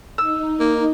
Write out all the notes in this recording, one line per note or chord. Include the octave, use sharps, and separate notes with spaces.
D#4 E6
A#3